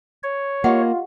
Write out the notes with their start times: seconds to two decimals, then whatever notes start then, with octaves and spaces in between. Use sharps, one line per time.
0.23 C#5
0.64 A#3 F4 G4 D#5 F#5